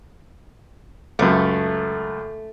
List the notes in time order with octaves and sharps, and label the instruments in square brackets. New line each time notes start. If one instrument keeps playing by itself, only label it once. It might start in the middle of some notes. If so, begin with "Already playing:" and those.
[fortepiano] C#2 F#2 [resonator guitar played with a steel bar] A3